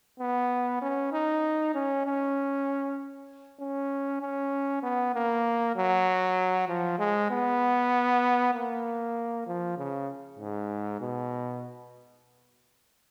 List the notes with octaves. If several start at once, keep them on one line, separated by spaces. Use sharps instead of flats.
B3
C#4
D#4
C#4
C#4
C#4
C#4
B3
A#3
F#3
F3
G#3
B3
A#3
F3
C#3
G#2
B2